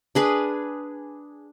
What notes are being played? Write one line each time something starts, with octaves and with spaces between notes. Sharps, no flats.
D4 G#4 B4